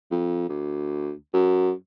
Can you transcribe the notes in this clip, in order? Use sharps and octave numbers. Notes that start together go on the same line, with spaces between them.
F2
D2
F#2